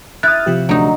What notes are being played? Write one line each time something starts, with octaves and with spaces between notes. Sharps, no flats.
E4 D#6 F6 F#6 A6
C3 F3 G4
D2 F#3 D#4